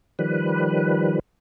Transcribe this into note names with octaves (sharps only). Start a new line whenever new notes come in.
D#3 F3 G3 B4